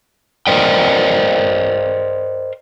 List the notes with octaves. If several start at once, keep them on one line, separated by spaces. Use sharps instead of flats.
A#4 C5 D5 D#5 G5